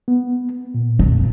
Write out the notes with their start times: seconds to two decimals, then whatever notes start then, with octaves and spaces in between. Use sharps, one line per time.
0.08 B3
0.74 A#2
0.99 F2